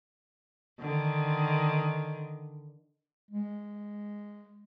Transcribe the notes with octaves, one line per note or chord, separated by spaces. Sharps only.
D3 D#3
G#3